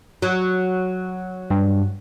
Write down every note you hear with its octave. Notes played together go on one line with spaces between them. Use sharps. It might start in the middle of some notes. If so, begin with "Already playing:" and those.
F#3
G2